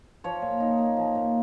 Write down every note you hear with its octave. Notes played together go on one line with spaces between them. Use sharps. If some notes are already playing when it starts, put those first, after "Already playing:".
F3 C#5
A#2
D#4
A#3
F3
A#2